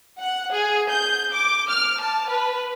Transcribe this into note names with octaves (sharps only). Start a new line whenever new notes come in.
F#5
G#4
G6
D6
F6
A5
B4